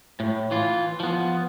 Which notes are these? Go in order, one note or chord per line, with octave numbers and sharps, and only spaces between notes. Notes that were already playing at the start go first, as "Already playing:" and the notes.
A2
E3 F4
F3 B3